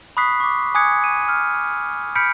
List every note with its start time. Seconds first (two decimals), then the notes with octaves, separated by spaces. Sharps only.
0.17 B5 C#6 D#6 F#6 B6 C7
0.40 C#6 D6
0.75 G#5 D6 D#6 F#6 G#6 C#7
1.04 D#7
1.28 F6
2.15 B5 F6 G6 B6 C#7 D7